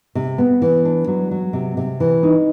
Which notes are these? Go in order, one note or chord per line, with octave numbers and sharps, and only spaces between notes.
C3
B3
E3
D4
F#3
F#3
C3
C3
E3
D#4